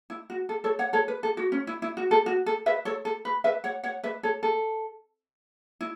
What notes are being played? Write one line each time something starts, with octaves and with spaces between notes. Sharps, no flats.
E4
F#4
A4
A4 C#5
C#5 F#5
A4 C#5
B4
A4
F#4
C#4
E4
E4
F#4
A4
F#4
A4
B4 E5
A4 C#5
A4
B4
B4 E5
C#5 F#5
C#5 F#5
B4 E5
A4 C#5
A4
E4